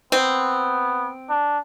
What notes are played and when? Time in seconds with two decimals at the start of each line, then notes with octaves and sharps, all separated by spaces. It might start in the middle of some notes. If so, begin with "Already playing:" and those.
0.12 B3 C4
1.29 D4